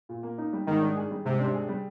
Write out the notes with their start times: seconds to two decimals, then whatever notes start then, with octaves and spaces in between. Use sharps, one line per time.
0.09 A#2
0.23 A#3
0.38 D#4
0.53 G3
0.67 G#2 D#3
0.82 D4
0.96 G#4
1.11 G3
1.25 G#2 C3
1.40 D4
1.54 G#4
1.69 G3